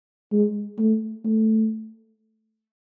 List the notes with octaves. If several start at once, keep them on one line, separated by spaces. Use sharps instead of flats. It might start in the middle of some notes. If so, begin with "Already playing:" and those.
G#3
A3
A3